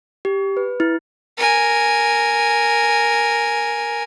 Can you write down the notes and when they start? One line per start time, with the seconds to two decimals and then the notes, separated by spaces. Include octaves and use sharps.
0.25 G4
0.57 B4
0.80 E4
1.38 A#4 G#5